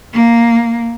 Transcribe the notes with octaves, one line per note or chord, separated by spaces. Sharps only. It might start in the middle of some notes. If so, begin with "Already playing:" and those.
A#3